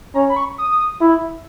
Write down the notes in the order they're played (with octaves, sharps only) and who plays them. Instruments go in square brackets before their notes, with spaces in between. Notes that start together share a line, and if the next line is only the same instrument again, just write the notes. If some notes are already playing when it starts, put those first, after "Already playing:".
[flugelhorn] C#4 [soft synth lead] A#5
[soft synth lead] B5
C#6
D#6
[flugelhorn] E4